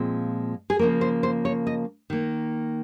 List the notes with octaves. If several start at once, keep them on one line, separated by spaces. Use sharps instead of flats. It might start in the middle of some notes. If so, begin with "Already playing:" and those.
Already playing: A#2 F3 G#3 C4
G#4
C#3 F3 A#3 A#4
C5
C5
C#5
D#5
D#3 A#3